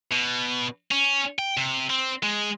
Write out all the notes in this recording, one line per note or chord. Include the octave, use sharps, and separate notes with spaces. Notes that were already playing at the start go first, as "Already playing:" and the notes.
B2
C#4
G5
C3
C4
G#3